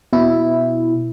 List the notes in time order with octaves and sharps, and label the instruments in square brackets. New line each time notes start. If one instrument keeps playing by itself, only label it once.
[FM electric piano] B2 E4